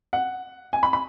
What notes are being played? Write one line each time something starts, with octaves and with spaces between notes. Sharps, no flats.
F#5
G#5
B5
B5